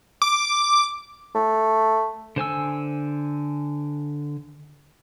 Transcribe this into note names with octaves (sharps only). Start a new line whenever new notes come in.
D6
A3
D3 C5 G#5 E6